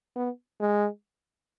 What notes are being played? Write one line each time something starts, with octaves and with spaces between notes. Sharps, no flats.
B3
G#3